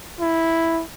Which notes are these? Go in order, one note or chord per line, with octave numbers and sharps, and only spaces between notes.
E4